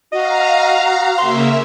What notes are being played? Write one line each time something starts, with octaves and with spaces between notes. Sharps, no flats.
F#4 D#5 F5 A#5
C#3 A#3 E5 C6